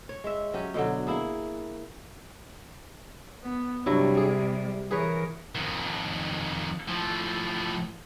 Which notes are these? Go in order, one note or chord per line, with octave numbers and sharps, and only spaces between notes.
C#5
G#3 E5
F#3 C#4 G4
B2 D3 F#3
A#3 E4 G#4
B3
G2 C3 F#3 G3 E4
G#4
E3 G#4 A#4 B4 C#5
F2 D#3
A2 F3